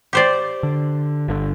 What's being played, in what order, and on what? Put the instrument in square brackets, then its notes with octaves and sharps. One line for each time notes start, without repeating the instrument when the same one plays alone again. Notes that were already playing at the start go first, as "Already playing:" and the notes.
[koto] G4 C5 D5
[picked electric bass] D3
G1 D3